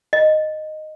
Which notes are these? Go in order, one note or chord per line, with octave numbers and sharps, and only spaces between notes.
D#5